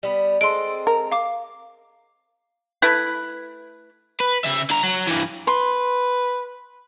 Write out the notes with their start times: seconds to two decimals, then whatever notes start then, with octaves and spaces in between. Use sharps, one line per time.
0.03 G3 B3
0.41 G#3 C4 A4 C6 D7
0.87 A#4
1.12 F5 D6
2.82 A3 E4 B4
4.20 B4
4.44 C#3 E5
4.70 D3 A#5
4.83 F#3
5.07 G2 E3
5.47 B4 C6